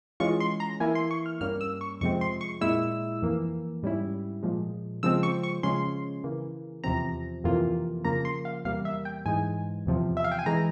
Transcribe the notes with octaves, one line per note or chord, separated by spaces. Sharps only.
E3 G#3 C#4 F4 C#6
C6
A#5
E3 A#3 E4 G#5
C6
C#6
F6
G2 G3 A#3 C#4 F6
E6
C#6
F2 C3 F3 G#3 C4 C#6
C6
C#6
A#2 G#3 E4 E6
F2 E3 A#3
G#2 G3 C#4 E4
A#2 F3 G#3
C#3 F3 G#3 C4 E6
C#6
C#6
C#3 F3 G#3 C#4 C6
C#3 E3 A#3
E2 C3 F3 C4 A#5
F2 C3 E3 A#3 F4
C#3 F3 A#3 A#5
C6
F5
E2 C3 G3 A#3 F5
E5
G5
G#2 E3 G#3 G#5
E2 C3 F3
E5
F5
G5
G#5
E3 G#3 A#5